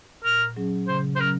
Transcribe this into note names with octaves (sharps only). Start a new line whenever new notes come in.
A#2 A#4
F#3 C#4 G#4
C#3 C5
C5
F#3 C#4 A#4